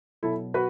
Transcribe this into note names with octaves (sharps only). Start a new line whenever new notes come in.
B2 F#3 E4 A4
F#4 B4